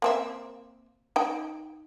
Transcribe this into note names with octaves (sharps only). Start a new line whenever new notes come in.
A#3 C4 E5
D#4 G5